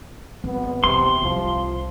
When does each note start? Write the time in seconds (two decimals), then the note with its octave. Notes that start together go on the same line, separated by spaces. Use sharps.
0.44 G#1 B3
0.84 B1 E2 C3 C6
1.22 C2 F2 F3